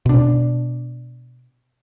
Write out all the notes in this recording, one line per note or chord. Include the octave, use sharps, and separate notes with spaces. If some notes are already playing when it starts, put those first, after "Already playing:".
B2 D4